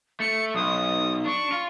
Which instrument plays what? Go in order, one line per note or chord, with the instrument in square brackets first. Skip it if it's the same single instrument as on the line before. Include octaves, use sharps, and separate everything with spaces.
[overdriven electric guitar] A3 [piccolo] C#7
[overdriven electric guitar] B1 [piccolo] D#6
[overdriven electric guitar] D4 [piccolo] C#6
[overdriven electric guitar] F4